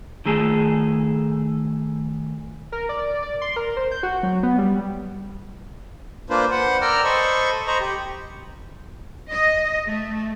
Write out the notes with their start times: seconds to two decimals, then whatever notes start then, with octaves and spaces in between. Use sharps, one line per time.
0.26 D#3 A3 G#4 A4
2.72 A#4
2.89 D5
3.22 D5
3.42 C6
3.56 A#4
3.77 C5
3.91 G6
4.03 F#4
4.23 F#3
4.43 B3
4.58 G3
6.30 A#3 D4 F4 B4 C5
6.51 B4 C5 F#5
6.82 A#4 D5 G5 A#5 E6 F6
7.04 A4 C5 D#5 B5 C#6
7.67 C5 D#5 A#5 B5 C#6
7.80 G4
9.31 D#5
9.86 A3